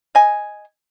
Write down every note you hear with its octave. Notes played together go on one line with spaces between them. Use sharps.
D#5 G#5